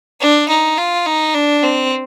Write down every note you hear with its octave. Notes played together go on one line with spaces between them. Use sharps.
D4
D#4
F4
D#4
D4
C4